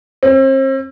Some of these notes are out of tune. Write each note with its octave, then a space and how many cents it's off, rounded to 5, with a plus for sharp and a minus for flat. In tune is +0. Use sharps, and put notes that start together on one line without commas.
C4 +40